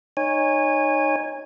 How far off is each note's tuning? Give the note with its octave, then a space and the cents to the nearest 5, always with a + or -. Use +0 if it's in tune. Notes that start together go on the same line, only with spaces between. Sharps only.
D#4 -20 C#5 -10 G#5 -20